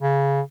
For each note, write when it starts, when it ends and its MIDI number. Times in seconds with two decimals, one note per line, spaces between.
0.02 0.41 49